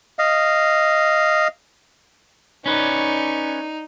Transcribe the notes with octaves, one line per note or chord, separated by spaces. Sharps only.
D#5 F5
C#4 D#4 B4 D5 C#6